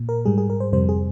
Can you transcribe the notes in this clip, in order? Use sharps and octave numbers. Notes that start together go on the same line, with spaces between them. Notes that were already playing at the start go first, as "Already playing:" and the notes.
Already playing: A#2
A#4
G#2 G3 G#4
G#4
A#4
C5
F2 C3 G3 C5
G#4